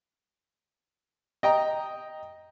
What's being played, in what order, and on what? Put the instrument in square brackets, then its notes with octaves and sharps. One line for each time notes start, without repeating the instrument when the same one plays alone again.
[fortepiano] D#5 G5 A#5